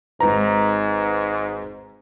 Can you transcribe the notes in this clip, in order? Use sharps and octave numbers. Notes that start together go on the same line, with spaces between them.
G#1 G#2 B4 A#5